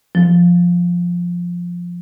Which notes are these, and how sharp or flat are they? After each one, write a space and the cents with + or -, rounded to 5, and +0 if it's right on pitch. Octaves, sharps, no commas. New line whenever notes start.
F3 +5